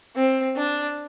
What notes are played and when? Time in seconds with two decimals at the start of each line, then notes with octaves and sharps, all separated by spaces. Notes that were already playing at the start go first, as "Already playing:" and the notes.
0.15 C4
0.56 D4